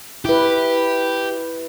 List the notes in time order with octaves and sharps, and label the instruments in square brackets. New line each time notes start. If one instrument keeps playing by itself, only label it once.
[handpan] E4 B4 [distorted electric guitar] G4